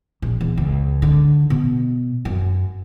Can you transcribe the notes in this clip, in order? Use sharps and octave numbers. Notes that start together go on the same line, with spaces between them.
A#1
E2
C#2
D3
B2
F#2